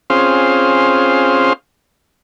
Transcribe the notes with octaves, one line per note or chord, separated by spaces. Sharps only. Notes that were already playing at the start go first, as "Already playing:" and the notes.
C4 C#4 F4 G#4 C5 F5